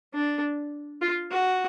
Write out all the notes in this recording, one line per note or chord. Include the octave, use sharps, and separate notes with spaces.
D4
F4
F#4